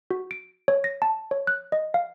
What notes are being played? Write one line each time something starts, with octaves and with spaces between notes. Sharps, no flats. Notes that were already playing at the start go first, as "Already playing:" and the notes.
F#4
D7
C#5
A#6
A5
C#5
F#6
D#5
F5